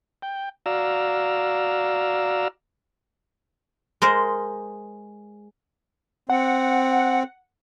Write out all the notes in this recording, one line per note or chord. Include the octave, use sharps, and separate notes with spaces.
G5
F#4 D5 F5 A#5 E6
G#3 A#4 C5 D#5
C4 F#5